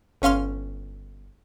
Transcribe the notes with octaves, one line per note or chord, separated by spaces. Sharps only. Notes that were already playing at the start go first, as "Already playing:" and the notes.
G1 C#4 F5 C6 F6